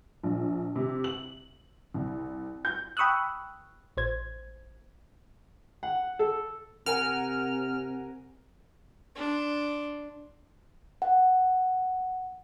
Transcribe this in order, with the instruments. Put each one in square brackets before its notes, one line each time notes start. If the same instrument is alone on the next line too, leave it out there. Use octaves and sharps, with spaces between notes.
[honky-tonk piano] A#1
C3
F#7
C2
G6
[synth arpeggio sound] G5 B5 C#6 D#6 E6 F#6
A1 C5 G#6
[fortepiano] F#5
A4
[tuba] C3 [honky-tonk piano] A#4 F#5 G#5 [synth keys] F6
[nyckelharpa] D4 C6
[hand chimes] F#5